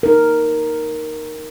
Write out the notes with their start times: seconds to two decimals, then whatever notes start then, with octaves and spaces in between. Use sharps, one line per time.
0.03 D#4 A#4